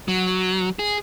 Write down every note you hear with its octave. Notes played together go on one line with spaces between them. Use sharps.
F#3
G#4